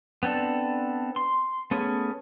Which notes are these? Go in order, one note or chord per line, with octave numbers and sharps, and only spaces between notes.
B3 C4 D4 A4
C6
A3 B3 C#4 G#4